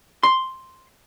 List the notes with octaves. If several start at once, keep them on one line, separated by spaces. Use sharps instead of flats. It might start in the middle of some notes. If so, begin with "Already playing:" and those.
C6